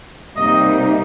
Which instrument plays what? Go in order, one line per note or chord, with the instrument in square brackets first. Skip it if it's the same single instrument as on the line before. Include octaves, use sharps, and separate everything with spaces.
[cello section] C3 G3 A#3 D#4 D#5